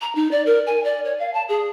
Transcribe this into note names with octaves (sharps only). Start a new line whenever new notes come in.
A#5
D#4
D5
A#4
G#5
D5
C#5
F5
A5
G#4